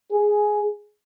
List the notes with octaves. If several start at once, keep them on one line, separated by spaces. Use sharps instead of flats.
G#4